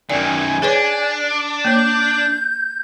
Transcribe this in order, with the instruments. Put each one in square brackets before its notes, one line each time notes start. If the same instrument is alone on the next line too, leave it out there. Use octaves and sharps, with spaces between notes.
[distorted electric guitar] F#2 D#3 [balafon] D5 [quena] G#5
[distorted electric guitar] D4 [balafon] G#4 B4 C#5
[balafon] A#3 C#5 [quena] G6